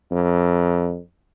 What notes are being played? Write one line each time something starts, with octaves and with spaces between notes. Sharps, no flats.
F2